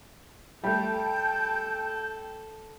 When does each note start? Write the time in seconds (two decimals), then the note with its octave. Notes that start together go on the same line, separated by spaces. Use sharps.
0.63 G3 A3 A4 G5 A5 G6